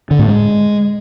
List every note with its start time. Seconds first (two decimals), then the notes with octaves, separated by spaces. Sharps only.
0.11 D3
0.19 A2
0.27 G#3